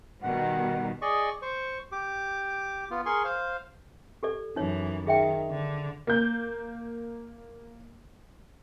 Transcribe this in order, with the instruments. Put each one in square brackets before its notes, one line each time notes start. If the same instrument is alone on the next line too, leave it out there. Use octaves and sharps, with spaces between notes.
[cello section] B2 D#3 G3 [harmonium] F#5
[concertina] G#4 D5 D#5 C#6
C5 C#6
G4 D6
B3 F4
G#4 A#4 G#5 C6 C#6
C5 F5
[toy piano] G4 A4 D5
[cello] F#2 E3 [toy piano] D#4 C#5
[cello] D#3 [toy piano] G#4 E5 G5
[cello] D3
[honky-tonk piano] A#3 G6